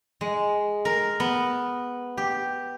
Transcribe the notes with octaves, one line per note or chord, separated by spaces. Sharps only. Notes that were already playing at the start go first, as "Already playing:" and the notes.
G#3
A#4
B3
G4